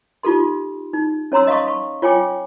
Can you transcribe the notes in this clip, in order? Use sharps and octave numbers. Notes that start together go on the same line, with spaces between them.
D#4 F4 G4 A4 C6
D#4
C#4 C#5 A#5 C6 E6
D#5 F5 C6 C#6 D#6
C#6
F4 C#5 G5 G#5 D6